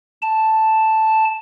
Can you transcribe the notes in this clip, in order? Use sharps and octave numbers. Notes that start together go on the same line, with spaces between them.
A5